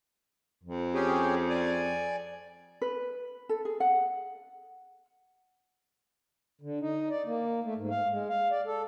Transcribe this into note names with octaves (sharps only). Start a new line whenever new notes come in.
F2
C#4 G4 G#4
D5 G#5
B4
A4
G#4
F#5
D3
D#4
D5
A#3
A3
G#2
F5
G#3
F5
D5
A4